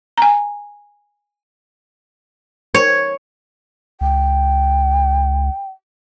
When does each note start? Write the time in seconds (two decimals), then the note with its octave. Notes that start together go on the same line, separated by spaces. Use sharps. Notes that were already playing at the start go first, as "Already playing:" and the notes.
0.18 G#5 A#5
2.74 C#5
4.01 C#2 G5